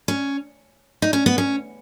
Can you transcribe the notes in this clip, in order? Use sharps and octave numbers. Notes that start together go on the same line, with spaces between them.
C#4
D#4
C#4
B3
C#4